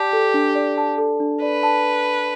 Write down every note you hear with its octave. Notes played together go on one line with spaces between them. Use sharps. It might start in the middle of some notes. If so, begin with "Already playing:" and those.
Already playing: G4 D5 A5
A4
D4
D5
A5
A4
D4
B4 D5
A5